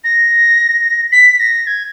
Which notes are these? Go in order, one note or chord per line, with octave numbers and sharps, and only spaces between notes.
A#6
B6
A#6
G#6